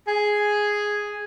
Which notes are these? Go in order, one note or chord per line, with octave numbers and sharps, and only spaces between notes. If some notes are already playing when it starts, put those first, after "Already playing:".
G#4